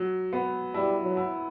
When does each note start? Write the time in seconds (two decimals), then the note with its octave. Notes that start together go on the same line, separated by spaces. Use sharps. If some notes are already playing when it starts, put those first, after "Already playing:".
Already playing: F#3
0.33 B3
0.74 G3 E4
1.03 F#3
1.17 E4